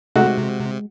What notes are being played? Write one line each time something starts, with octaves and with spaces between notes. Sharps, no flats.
C3 G#3 A3 D#4 F#4